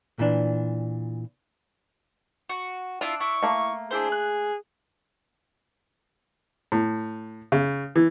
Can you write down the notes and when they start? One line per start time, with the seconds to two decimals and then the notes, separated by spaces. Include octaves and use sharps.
0.19 A#2 E3 D4
2.49 F#4
3.01 D4 E4 F4
3.21 E4 C#6
3.42 A3 A#3
3.91 D4 E4 G#4 C5
4.12 F#6
6.72 A2
7.52 C#3
7.96 E3